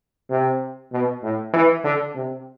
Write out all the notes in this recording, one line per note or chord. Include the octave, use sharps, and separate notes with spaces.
C3
B2
A2
E3
D3
C3